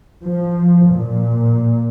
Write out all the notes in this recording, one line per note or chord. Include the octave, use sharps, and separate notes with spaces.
F3
A#2